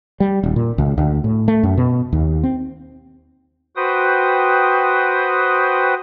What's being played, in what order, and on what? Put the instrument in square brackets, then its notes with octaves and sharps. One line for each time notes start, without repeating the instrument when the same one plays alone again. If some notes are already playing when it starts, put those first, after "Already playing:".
[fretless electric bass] G3
D#1
A#2
C#2
D2
A2
A3
F#2
B2
D#2
C4
[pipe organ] F#4 B4 C5 G5 D#6